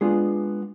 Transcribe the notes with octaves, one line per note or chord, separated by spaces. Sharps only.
G#3 B3 D4 F4 G#4